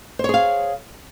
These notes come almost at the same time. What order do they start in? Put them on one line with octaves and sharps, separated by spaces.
C5 C#5 G#4 F5